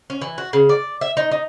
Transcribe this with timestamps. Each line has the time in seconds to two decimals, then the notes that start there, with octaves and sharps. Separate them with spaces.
0.10 C#4
0.21 E3
0.38 F#4
0.53 C#3
0.69 D5
1.01 E5
1.17 D#4
1.31 D#4